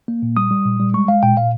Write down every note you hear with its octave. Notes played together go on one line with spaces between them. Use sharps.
A#3
A#2
G3 D#6
G3
A#2
G3
G#3 C#6
G#3 F5
A#2 G5
A#2 F5